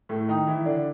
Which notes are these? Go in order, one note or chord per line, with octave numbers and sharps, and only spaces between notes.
A2 A3
D#3 D#4
E3 E4
D3 D4